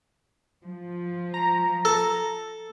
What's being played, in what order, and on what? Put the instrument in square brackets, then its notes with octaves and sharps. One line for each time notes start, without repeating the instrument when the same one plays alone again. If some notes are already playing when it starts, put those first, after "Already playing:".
[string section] F3
[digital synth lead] A#5
[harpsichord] A4